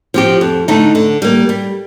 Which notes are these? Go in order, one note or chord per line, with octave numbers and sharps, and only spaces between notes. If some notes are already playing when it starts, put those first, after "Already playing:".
F3 C4 G4
F2
D3 A3 D#4
D3
G3 A#3
G3